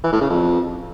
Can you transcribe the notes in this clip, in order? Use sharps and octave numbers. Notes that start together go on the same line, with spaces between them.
E3
A2
C#3
F2